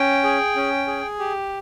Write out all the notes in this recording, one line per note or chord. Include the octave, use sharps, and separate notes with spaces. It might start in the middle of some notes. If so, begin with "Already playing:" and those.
Already playing: C#4 G5
G#4
C#4
G#4
G4